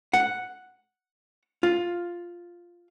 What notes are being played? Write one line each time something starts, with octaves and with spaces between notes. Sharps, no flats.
F#5
F4